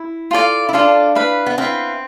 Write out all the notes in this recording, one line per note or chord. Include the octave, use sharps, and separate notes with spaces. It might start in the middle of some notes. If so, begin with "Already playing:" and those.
Already playing: E4
F4 A4 D5 F5
E4
D4 F4 A4 D5 F5
E4 B4 F5
B3
C4 E4 B4 F5